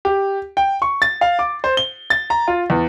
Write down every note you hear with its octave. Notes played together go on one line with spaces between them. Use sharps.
G4
G5
C#6
A6
F5
D6
C5
G7
A6
A#5
F4
E2